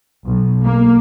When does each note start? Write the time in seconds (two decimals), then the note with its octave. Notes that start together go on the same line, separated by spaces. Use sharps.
0.24 B1
0.65 A#3